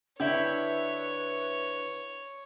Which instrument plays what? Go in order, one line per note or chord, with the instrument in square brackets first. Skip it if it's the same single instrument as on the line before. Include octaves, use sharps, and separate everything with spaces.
[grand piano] D3 [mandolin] E4 G5 [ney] B4 [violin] C#5